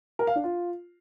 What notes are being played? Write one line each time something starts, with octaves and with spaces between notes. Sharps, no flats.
A#4
F5
D4
F4